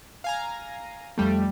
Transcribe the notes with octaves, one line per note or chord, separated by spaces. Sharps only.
F5 G#5 A#5
F2 G3 A3